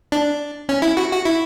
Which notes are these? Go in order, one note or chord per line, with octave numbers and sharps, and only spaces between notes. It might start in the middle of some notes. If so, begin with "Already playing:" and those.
D4
C#4
E4
F#4
F#4
E4